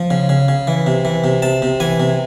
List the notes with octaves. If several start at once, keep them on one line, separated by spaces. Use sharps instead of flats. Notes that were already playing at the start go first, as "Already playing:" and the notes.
Already playing: F3
C#3
C#3
C#3
E3
C3
E3
C3
C3 A5
C3
E3 G#5
C3